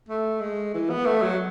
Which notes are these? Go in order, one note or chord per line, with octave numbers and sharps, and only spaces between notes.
A3
G#3
E3
B3
A3
F#3